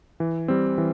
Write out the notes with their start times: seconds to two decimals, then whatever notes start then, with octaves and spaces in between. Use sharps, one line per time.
0.20 E3
0.48 G3 C4
0.78 E3